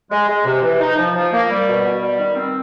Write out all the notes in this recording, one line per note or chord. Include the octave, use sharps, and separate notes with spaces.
G#3
G#3
C3
E3
D#4
F3
F3
A#3
G3
B2
B2
G3
D#3
C4